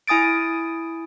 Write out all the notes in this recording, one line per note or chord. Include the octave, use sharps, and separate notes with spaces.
E4 G#5 D#6 A6 D7